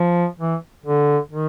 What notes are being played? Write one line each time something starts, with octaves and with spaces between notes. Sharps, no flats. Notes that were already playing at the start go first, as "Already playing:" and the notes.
Already playing: F3
E3
D3
D#3